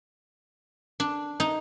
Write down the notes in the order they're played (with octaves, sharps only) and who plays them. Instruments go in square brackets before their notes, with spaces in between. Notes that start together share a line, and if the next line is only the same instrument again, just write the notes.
[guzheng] D4
D#4